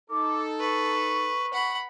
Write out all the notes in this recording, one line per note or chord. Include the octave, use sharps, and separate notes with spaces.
D#4 A4 D6
B4 C#6
F#5 B5